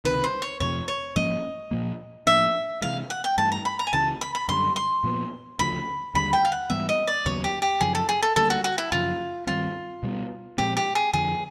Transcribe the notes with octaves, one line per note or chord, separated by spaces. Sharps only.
C#2 C3 D#3 B4
C5
C#5
F2 C3 F3 A3 C#5
C#5
G#2 F3 A#3 C#4 D#5
A#2 F3 A#3
A2 F3 A#3 D4 E5
C3 E3 G#3 F5
F#5
G5
G2 E3 A3 A5
A#5
B5
A#5
G#5
C#2 C#3 E3 A5
B5
B5
F#2 D3 G3 C6
C6
A#2 F3 G#3 B3
D2 C#3 F3 A3 B5
D#2 D3 G3 B5
G5
F5
F#5
G#2 E3 G3 B3 E5
D#5
D5
D#2 C#3 F#3 B3 C#5
G4
G4
F#2 C#3 F3 G#4
A4
G#4
A4
D2 D3 G3 A#3 A4
F#4
F#4
E4
F#2 C#3 F3 F4
G2 D#3 G3 C4 F4
B2 G3 B3
A#2 F3 G#3 C4 G4
G4
G#4
F2 D3 F3 G#4